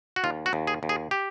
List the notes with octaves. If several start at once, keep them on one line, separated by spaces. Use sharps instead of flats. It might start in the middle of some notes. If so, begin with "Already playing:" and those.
F#4
D#2 F4
F#4
D#2
G#4
D#2
G#4
G4